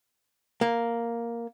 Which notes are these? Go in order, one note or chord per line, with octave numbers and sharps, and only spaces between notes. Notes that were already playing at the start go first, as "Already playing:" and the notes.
A#3